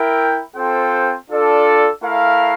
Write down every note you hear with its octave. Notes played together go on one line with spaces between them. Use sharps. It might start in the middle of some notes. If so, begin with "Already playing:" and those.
Already playing: E4 A#4 E5 G5
C4 F4 A4 C5 G5
D4 F4 A4 D5
A3 E4 A#4 F5